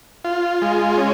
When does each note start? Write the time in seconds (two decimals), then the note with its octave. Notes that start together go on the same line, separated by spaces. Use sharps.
0.24 F4
0.62 G#3
0.98 C#4